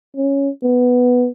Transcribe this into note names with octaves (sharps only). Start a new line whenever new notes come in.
C#4
B3